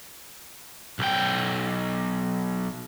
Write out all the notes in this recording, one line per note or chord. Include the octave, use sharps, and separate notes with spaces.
B1 G5